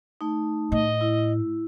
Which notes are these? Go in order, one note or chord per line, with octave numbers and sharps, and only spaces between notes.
A3 D#4
A2 D#5
E4